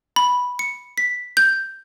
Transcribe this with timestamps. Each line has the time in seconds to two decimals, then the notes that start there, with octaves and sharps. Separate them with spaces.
0.16 B5
0.59 C#7
0.98 B6
1.37 G6